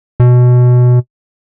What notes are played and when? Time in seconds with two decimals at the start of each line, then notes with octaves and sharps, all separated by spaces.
0.20 B2